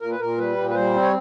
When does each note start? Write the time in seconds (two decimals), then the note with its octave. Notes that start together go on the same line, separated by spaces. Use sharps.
0.01 A#2 A#4
0.11 B4
0.19 A#2 A#4
0.38 G3 B4
0.57 A#2
0.69 B4
0.75 G3 C5
0.94 C4
1.02 C#5